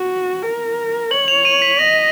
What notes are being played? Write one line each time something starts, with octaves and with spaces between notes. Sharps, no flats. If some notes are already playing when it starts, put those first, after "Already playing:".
Already playing: F#4
A#4
C#5 F#7
F7
D#7
B6
D#5 A#6